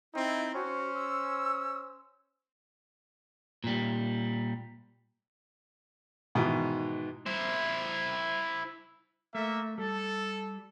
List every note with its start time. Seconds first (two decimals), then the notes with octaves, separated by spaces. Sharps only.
0.14 C4 D#4 E4
0.54 C#4 F#4 C5
0.94 E6
3.64 A#2 G3
6.35 G#2 B2 D#3 E3
7.27 E4 C5
9.35 A3 A#3 E5
9.78 G3 A4